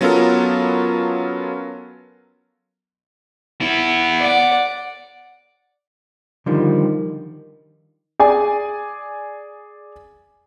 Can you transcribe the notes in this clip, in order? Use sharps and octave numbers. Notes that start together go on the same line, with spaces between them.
F#3 B3 C#4 F4 A4 A#4
B3 E4
D5 F#5
D3 D#3 F3 G3
G#4 D5 G#5